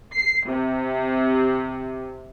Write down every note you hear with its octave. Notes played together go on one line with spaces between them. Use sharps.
C7
C3